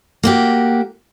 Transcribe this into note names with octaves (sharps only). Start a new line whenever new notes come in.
A#3 F#4 G4